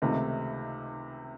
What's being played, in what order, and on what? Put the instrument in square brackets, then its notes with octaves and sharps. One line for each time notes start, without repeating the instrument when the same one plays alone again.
[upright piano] C#2 C3 D#3 A3